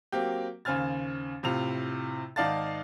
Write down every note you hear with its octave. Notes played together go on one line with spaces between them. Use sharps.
F#3 A#3 C4 G4
D#2 C#3 C5 G#5 F6 A6
A2 C3 F4 F7
G#1 D#4 D5 F5 A5 A6